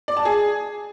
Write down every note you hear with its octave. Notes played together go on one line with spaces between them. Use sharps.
D5
A5
G#4